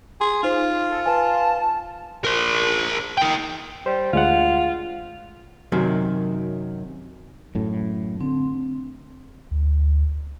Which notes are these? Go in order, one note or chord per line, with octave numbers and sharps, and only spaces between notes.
G#4 C6
D#4 F4 C5
A4
B4 F5 G#5 A5
A#4 C5
A#3 G5
G3 C5
D2 G#3 F4 F#5
F#2 C3 D#3 F#3
F#2 A2
D3 C4
D2